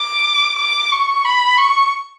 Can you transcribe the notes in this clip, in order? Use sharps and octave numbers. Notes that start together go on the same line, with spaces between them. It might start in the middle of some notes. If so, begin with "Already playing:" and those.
Already playing: D6
D6
C#6
B5
C#6